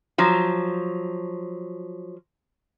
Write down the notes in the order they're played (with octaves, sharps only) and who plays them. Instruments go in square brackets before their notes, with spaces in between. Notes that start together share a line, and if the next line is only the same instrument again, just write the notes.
[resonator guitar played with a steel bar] F3 F#3